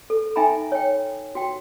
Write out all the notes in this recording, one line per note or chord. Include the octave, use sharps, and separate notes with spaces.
A4
D#4 E5 G5 G#5 A#5 B5
C#5 G5
F#4 G5